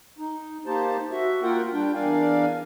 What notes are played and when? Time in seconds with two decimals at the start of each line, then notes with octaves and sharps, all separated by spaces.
0.18 D#4
0.66 A#3 D#4 G4 C5 A5
1.12 F#4 E5
1.43 A#3 F4 A#4 F#5 G5
1.72 G3 D4 G5
1.94 E2 D4 A#4 D5 F5 G#5